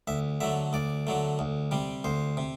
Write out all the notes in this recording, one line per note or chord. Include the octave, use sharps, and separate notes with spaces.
D2 E5
D3 F#3 A3 E5
D2 D5
D3 F#3 A3
D2
C3 G3
D2 C5
C3